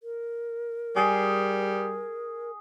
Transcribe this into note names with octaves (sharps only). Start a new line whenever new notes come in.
A#4
G3 G#4